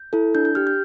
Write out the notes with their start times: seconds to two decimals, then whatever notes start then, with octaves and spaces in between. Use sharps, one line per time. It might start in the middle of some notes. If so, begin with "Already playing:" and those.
Already playing: G6
0.13 E4 A4
0.35 D4 G6
0.45 G6
0.55 G4 F6
0.67 G6